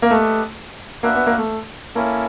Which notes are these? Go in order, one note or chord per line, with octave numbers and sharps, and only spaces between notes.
A#3
A3 G4 B4 D#5
A#3 D4 F#4 B4 E5
B3
A#3
A3
A#3 C#4 E4 A4